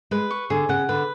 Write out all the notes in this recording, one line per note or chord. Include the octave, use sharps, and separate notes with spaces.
G#3 B4
C#6
D3 G#4
C#3 F#5
D3 B4